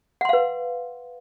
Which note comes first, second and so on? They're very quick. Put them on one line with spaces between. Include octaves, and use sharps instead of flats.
F#5 C6 F5 B4